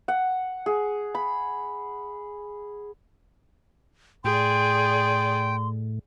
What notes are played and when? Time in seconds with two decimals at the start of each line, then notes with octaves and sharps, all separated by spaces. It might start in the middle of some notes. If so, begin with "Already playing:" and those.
0.08 F#5
0.66 G#4
1.15 B5
4.24 A2 G#4 D5 G5 C6